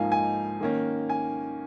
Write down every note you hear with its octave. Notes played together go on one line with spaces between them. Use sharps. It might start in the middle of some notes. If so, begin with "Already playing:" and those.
Already playing: G#2 F3 A#3 D#4 F5 G#5
G#5
D#3 A#3 C#4
G#5